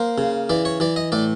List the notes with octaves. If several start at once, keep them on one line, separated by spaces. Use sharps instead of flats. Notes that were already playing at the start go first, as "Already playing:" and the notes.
Already playing: A#3 C5
C#3
E3 D5
C#5
E3 D5
D#5
A2 D5